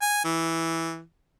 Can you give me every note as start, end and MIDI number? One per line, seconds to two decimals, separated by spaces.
0.02 0.22 80
0.25 1.01 52